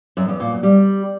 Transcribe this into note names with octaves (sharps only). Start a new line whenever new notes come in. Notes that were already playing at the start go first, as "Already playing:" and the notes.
F#2
E2
A#2
F#2
G3